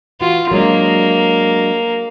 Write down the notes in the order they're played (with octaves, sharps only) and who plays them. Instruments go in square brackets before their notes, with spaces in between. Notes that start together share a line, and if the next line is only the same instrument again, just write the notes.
[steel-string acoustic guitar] E3 F#4 [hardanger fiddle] F4
[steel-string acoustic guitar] F#3 G#3 D4 [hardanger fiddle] A#3